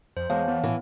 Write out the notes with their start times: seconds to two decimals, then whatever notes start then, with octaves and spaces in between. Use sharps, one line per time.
0.17 F2 C5
0.30 E2 G#3 C#5 F5 A5
0.48 E3 B3
0.64 A2 E3